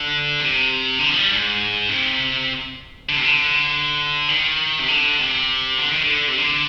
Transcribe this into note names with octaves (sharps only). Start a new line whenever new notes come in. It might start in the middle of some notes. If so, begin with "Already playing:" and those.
Already playing: D3
C3
D3
D#3
F3
G3
G#2
C3
D3
C3
D3
D#3
C3
D3
C3
D3
D#3
D3
C3
D3